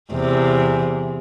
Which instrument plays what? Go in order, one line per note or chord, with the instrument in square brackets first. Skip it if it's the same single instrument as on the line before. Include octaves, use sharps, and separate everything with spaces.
[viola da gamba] E2 C3